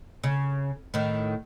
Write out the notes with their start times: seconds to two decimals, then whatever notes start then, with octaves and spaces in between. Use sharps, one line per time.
0.24 C#3
0.94 A2 D#3